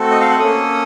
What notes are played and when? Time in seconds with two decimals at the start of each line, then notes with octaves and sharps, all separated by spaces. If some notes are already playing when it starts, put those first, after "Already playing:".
Already playing: A3 C4 F#4 A4
0.11 D#5
0.21 F5
0.30 F#5
0.40 A#3 C#4 A4 D#6